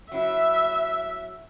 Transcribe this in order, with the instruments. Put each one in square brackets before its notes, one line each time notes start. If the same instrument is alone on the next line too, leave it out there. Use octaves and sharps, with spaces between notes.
[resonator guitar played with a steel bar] F#3 E4 [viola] E5